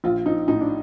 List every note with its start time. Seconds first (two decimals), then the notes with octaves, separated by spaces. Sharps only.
0.04 A#1 F4
0.26 F3 D#4
0.48 A2 D#4
0.61 D4